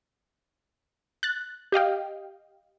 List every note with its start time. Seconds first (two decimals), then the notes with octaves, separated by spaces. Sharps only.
1.23 F#6 A6
1.72 G4 D#5 F5 G5